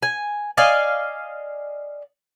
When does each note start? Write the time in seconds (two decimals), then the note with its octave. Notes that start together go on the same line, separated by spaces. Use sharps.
0.03 G#5
0.57 D5 D#5 F5 G#5